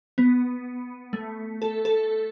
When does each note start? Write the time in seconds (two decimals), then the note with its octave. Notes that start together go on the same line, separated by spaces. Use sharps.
0.18 B3
1.13 A3
1.62 A4
1.85 A4